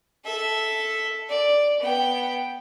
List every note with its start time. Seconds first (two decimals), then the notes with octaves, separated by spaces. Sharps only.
0.25 A4 E5
1.29 D5
1.79 B3 G5